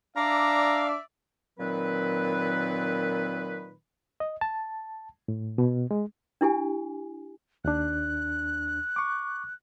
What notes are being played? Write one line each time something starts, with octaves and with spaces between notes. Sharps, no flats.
D4 D5 E5 F5 A#5
A#2 D#3 F#3 C4 B4
D#5
A5
A2
B2
G#3
D4 E4 G4 G#5
D#2 D4 F#6
C#6 D6